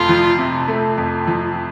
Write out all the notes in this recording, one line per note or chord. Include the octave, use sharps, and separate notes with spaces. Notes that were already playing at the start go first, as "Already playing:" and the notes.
Already playing: F2 C3 A3 F4
F3
C3
A3
F2
F3